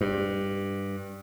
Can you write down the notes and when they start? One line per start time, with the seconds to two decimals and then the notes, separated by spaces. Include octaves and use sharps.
0.01 G2